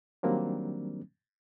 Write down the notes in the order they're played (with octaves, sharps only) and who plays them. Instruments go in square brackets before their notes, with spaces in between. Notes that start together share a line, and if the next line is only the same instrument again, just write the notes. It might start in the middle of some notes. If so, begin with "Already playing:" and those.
[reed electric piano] D#3 F#3 G3 A#3 C4 D4